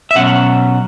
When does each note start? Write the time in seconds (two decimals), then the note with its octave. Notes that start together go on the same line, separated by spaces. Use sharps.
0.11 E5
0.15 B2 F#3 C#4 F#5